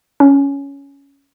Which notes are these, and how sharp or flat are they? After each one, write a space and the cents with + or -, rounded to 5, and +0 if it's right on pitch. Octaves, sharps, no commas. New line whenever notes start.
C#4 +10